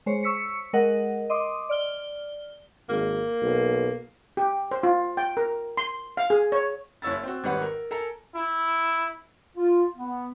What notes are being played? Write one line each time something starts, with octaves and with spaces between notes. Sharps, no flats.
G#3 C5 C#5
C#6 E6 B6 C#7
G#3 A#4 D#5 F#5
D#5 C6 D6 D#6
D5 F6 G7
G#1 A#3
B1
G4
C5
F4
G5
A#4
C6
F5
G#4
C#5
F#1 E4 C#5 E6 A6
C4 F#4
G#1 D#3 G3 B4 C#5 F#5
A#4
A4 A#4 G#5 A#5
E4
F4
B3